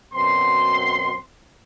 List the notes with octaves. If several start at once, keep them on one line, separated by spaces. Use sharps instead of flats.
F#2 B2 C4 C6